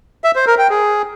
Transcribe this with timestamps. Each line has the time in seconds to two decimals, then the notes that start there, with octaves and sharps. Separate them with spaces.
0.24 E5
0.36 C5
0.47 A#4
0.58 G5
0.70 G#4